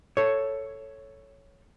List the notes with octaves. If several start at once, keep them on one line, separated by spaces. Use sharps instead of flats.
A4 C#5